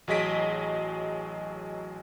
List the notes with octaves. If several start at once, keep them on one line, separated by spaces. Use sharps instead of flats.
A1 F#3 G#4 D#5 B6 D7